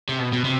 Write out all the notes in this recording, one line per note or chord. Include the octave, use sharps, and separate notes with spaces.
C3
B2
B2
C3